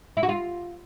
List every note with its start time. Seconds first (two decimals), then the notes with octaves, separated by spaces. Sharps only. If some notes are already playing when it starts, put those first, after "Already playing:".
0.17 E4
0.23 F#4
0.29 F4